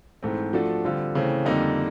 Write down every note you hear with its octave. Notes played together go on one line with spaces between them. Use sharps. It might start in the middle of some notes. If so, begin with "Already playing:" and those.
G#2 E3 A3 C4
F3 A3 D4 F#4 A4
D3 G3 C4 F4
C#3 E3 A3 C4
F2 D3 G3 A#3 D#4